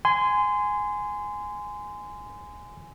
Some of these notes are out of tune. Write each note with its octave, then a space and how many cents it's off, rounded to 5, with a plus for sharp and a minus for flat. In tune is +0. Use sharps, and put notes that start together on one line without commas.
G#5 +0 C6 -25